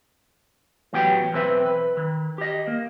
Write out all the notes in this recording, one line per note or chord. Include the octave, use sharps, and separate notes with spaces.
A2 E3 F#3 B3 G4 G5
B1 E2 C4 B4 E5
B4
D#3
G4 D#5
A#3